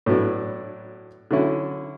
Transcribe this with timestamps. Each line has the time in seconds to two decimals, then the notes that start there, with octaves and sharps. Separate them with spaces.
0.06 A2 F#3 B3 D4
1.31 D3 F#3 C#4 E4